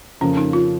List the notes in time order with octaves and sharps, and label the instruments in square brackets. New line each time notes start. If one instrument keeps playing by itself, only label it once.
[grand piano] F2 C#3 F3 A#3 [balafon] C#4
[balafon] D#4
F4